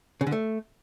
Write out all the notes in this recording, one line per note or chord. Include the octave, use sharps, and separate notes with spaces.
C#3
D3
A3